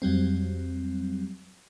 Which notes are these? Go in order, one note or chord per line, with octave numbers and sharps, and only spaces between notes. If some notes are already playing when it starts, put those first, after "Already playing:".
F2 F#3 G3 C4